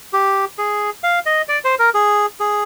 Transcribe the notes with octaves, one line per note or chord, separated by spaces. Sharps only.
G4
G#4
F5
D#5
D5
C5
A#4
G#4
G#4